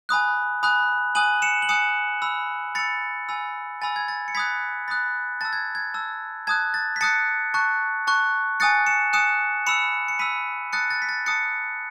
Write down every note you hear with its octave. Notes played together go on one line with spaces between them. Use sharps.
G#5 B5 D#6 F#6
G#5 B5 D#6 F#6
G#5 D#6 F#6 D#7 F#7
C#7 E7
F#7
G#5 D#6 F#6 C#7 E7
B5 E6
B5 E6 A6 C#7
G#5 B5 E6
G#5 B5 E6 A6
G#6
A6
C#7
B5 D#6 F#6 G#6 B6
B5 D#6 F#6 A6
A5 E6 A6
G#6
G#6
A5 E6
A5 D#6 F#6 G#6
A6
B6
A5 D#6 F#6 A6 C#7
A5 C#6 F#6
A5 C#6 F#6
G#5 D#6 F#6 A6 C#7
C#7 E7
G#5 D#6 F#6 C#7 E7
B5 E6 C#7 E7
C#7
B5 E6 B6 D#7
A5 D#6 F#6 A6 C#7
A6
B6
A6
A5 D#6 F#6 A6 C#7